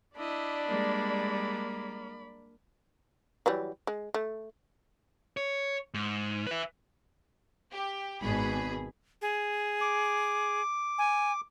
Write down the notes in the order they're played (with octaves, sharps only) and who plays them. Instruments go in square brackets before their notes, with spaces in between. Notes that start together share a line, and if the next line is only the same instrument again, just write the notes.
[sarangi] D4 [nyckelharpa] E4 D#5 [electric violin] D5 B5
[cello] G3 G#3 [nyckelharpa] A#3
[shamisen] E3 F#3 G3
G#3
A3
[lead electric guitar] C#5
G#2
B4 E5
[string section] G4
G#1 B2 G#4 B5
[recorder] G#4
[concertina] D6
[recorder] G#5